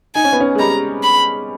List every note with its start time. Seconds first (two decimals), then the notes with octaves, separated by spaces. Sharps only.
0.15 D#4 G#5
0.24 C#4
0.32 B3
0.40 C#4
0.55 G#3
0.59 G3 A#5
1.04 B5